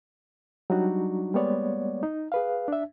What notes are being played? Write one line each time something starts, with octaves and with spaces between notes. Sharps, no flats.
F#3 G3 D4 D#4 F#4
G3 G#3 A#3 B3 C#5 D5
D#4
G#4 B4 F5
D4 E5